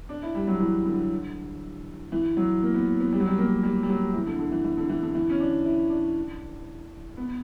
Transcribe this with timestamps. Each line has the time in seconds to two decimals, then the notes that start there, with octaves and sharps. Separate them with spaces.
0.09 D4
0.22 E4
0.35 G3
0.47 F#3
0.60 E3
0.85 D3
2.12 E3
2.37 F#3
2.63 A#3
2.74 B3
3.00 B3
3.13 G3
3.20 F#3
3.27 G3
3.38 A#3
3.63 G3
3.83 G3
3.89 F#3
4.14 E3
4.26 D3
4.39 D3
4.52 E3
4.64 E3
4.77 D3
4.89 E3
5.02 D3
5.15 E3
5.30 C#4
5.40 D4
5.65 E4
5.90 D4
7.17 B3